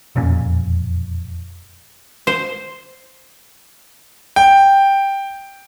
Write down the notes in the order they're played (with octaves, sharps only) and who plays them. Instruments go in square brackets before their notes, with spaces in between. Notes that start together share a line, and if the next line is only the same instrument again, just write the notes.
[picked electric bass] E1 F2 A#2 C#4
[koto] C5
[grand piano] G5